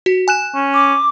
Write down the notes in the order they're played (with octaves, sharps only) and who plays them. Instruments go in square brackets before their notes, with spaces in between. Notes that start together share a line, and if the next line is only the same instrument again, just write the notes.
[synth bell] F#4
G#5 F#6 E7
[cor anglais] C#4
[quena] D6